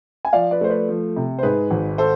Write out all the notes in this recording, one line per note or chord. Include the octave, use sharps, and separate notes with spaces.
G#5
F3 D5 F5
B4 D5
A3 C5
B4 D5
F3
C3
C5
G#2 G#4 B4
G#1
A4 C5